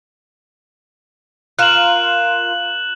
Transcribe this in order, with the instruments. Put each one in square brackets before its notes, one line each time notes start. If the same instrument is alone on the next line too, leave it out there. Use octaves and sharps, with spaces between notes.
[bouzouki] F4 A#4 [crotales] F#6 E7 F#7